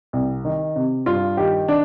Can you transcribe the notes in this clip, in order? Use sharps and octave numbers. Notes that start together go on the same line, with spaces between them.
C2
D#3
C3
G2 F4
D#3 G4
D#3 D4